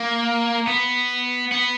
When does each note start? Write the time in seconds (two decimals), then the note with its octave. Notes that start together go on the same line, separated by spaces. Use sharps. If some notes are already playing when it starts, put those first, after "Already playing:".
Already playing: A#3
0.67 B3
1.52 B3